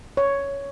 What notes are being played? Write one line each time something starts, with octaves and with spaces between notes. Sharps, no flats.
C#5